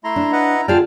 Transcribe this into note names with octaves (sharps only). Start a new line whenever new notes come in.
A3 E4 A#5 C6
D4
B4 D#5 F#5
D3 F4 G#4 D5 G5 A5 F6